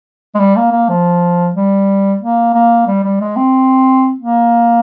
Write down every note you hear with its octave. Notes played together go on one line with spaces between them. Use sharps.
G#3
G3
A#3
A#3
F3
G3
A#3
A#3
G3
G3
G#3
C4
A#3